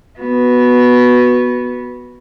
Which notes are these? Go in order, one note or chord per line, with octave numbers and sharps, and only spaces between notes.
B3 F#4